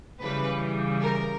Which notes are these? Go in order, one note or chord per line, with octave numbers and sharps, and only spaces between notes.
C#3 E3 G3 B4
A#4